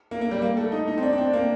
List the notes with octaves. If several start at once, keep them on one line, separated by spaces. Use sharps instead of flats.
A#3
A#3
G3
A#3
A3
D#4
D#4
C4
D4
D4
C4
A#3